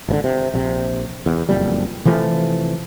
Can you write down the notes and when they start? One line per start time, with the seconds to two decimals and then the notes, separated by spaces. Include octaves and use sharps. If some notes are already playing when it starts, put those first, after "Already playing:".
0.09 G#1 B2 D3
0.24 C3
0.54 A#1 C3
1.26 E2
1.49 F#1 F2 A#2 G3
2.05 C3 E3 F3 A3